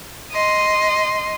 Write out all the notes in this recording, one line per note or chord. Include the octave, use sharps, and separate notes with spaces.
D#5 C6